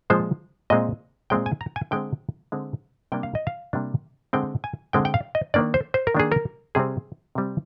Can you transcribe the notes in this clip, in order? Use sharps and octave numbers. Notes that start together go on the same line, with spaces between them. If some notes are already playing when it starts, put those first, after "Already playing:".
A#2 F3 G#3 C4 C5
A#2 G#3 C4 D#5
A#2 G#3 C4 G5
G#5
A#5
G#5
D3 G#3 C4 G5
D3 G#3 C4
C3 G3 A#3 D4 G5
F5
D#5
F5
C3 G3 A#3 D4
D3 G#3 C4 G5
G#5
D3 G#3 C4 G5
G5
F5
D#5
D#3 A#3 D4 D5
C5
C5
A#4
D#3 A#3 D4 G#4
A#4
C3 G3 C4 G#4
C3 G3 C4